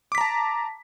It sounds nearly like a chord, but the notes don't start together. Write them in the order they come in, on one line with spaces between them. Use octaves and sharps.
D6 B6 A#5 A5